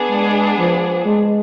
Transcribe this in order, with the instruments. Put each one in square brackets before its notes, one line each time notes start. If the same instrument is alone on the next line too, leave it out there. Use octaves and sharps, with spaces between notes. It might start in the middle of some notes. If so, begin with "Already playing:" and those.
Already playing: [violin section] B3 D4 G#4
[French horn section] G#3
F3
G#3